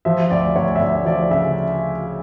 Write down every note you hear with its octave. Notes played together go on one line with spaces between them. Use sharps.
F3 E5
D2 D5
D2 C#5
E5
D2 D5
F3 D5
C#3 E5